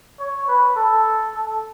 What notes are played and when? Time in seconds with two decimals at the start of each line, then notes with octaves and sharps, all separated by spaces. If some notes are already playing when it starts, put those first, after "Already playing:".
0.20 C#5
0.48 B4
0.76 A4
1.33 A4